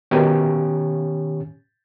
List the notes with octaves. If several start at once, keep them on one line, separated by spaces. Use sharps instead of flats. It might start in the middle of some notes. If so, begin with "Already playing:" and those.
B2 D#3 C#4 G4 C#5 G#5